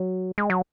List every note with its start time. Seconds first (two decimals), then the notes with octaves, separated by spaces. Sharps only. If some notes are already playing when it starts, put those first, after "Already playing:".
Already playing: F#3
0.38 G#3
0.50 F#3